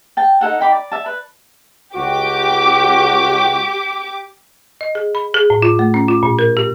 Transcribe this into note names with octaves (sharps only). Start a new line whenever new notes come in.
G5 A5
D#4 E4 A4 F#5
D#4 G5 B5 D6
D5
E5 A5
B4
C#2 F#4 G4 D6
D#5
G#4
B5
G#4
A2
F4
A3
C#4
F4
A#2
A#4
G4